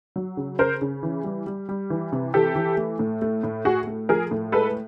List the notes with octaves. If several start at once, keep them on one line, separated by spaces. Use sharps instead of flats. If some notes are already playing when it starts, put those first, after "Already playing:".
F#3
C#3
C#3 A#4 C5
C#3
E3
G3
G3
G3
E3
C3
E3 G4 A4
E3
A3
A2
A3
A2
A2 F#4 G#4
A3
F3 G#4 A#4
A2
G#3 A4 B4